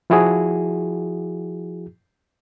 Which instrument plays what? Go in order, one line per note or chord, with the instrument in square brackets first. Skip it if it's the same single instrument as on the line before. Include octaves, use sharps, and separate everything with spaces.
[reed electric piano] F3 E4 F#4 G#4